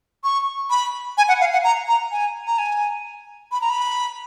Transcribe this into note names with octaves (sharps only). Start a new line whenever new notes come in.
C#6
B5
G#5
F#5
F5
F#5
A#5
A#5
G#5
A#5
G#5
B5
A#5
B5